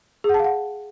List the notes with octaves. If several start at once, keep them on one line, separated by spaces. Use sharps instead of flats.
G#4
F#5
A5
F5
F#5